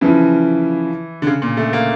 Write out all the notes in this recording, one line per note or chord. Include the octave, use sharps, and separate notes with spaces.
C#3 E3 F3 C#4 E4
D3
C#3
A#2
A3
A#3